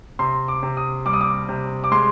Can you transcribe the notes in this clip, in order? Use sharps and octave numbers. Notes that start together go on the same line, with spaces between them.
C3 C6
D6
C3
D#6
G3 D6
D#6
D6
C3
D6
G#3 C6